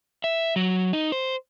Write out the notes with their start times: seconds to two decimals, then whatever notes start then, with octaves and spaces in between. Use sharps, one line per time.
0.24 E5
0.56 F#3
0.93 D#4
1.12 C5